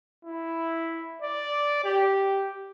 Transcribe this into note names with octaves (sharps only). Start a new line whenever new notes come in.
E4
D5
G4